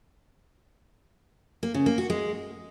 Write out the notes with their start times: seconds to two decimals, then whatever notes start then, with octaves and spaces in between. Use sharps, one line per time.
1.63 A#3
1.74 C#3
1.86 A#3
1.98 F#4
2.10 G#3